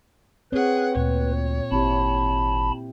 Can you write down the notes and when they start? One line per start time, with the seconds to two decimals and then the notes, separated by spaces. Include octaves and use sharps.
0.52 C4 G#4 B4 C#5 F#5
0.96 D2 A#2 C#5
1.71 G#1 C4 E4 G4 A5 B5